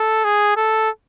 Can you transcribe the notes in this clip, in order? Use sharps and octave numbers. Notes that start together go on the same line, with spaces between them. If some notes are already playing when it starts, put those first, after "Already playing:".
Already playing: A4
G#4
A4